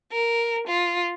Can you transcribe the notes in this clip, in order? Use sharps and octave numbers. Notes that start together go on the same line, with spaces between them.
A#4
F4